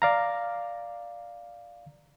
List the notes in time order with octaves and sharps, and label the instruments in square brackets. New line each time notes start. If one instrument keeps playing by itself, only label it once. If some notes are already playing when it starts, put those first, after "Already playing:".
[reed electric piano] D5 F5 A#5